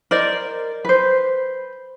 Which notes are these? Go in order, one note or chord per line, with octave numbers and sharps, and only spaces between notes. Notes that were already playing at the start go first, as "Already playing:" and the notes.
A#4 C5 D5 D#5
B4 C5